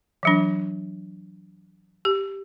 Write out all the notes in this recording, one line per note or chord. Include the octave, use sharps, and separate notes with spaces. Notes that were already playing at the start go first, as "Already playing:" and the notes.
E3 F#3 D4
G4